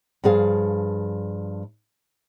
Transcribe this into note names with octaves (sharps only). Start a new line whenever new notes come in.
G2 F3 G#4 F5